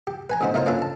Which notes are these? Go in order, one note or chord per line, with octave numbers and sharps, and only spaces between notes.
G4
B4 G#5 A#5
A1 D3 B3 D#4 C5
A3 D#4 F4 A#4 C5 C#5
A#3 C#4 D4 F4 A4 B4
A5